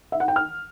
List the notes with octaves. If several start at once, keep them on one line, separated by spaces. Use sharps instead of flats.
E5
F#5
G5
F6